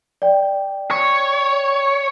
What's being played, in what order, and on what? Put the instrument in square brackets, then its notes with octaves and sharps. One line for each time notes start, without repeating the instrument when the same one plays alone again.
[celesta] D5 G5
[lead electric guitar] C#5